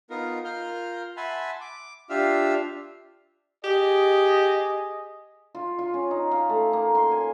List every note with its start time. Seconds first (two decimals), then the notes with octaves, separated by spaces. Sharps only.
0.10 B3 D#4 F4 A#4
0.45 F4 A#4 F6 G6
1.17 E5 F#5 G#5 A5 B5 C6
1.61 D6
2.10 D4 F4 G4 E5 F5
3.64 G4 G#4 D#5
5.55 F4
5.79 F4
5.94 C#4
6.11 D#4
6.31 F5
6.49 A3
6.73 A#3
6.95 C6
7.11 G#5